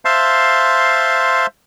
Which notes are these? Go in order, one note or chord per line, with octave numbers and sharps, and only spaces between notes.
C5 E5 F5 A5 C6